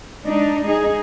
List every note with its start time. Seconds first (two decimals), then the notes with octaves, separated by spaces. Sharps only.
0.23 G#3 D4 D#4
0.65 D#4 G#4